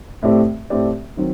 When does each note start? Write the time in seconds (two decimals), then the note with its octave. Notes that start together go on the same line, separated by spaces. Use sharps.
0.22 A2 A3 C4 G4 D5
0.70 A2 A3 C4 G4 D5
1.17 D#3 F#3 C4